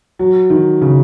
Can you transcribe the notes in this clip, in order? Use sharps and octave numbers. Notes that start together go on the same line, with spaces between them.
F#3
D#3
C#3